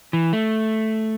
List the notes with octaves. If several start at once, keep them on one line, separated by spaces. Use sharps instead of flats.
E3
A3